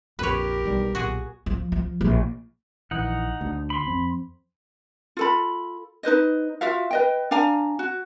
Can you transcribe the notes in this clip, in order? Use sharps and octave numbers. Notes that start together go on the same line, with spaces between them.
A#1 F2 G4 A#4 B4 C#5
E1 B1 G3
B1 A#2 F#4 G#4
F3
F3
A#1
A#1 E3 D#4 F#5
D2
B5 C6
F2 C4
F4 A4 B5
D#4 B4 C5 D#5
F4 F#4 E5 F5
B4 D#5 G5
D4 F5 G#5 A#5
F#4